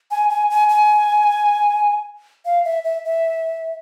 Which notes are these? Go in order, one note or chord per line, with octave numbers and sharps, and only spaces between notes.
G#5
G#5
G#5
G#5
F5
E5
E5
E5